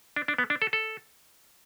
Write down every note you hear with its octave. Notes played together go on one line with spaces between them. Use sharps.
D4
D4
B3
D4
A4
A4